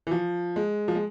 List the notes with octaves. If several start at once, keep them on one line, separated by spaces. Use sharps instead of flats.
E3
F3
G#3
F3
G#3